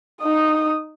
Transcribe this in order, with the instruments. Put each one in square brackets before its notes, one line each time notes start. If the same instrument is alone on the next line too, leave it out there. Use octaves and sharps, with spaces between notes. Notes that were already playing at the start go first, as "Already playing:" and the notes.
[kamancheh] D#4 D#6